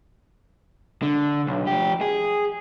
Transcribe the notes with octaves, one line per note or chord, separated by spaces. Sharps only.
D3
B1
F3 G4
G#4